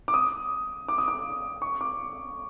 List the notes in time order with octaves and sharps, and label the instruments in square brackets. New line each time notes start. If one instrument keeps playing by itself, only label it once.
[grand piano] D6
D#6
D6
D#6
D6
C#6
D6